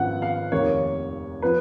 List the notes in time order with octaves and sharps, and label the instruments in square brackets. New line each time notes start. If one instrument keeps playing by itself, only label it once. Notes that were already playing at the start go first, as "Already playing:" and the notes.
Already playing: [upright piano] G#1 F#2 F3 B3 F#5
F5
F1 D#2 D#3 A#3 C#5
F3 B3 B4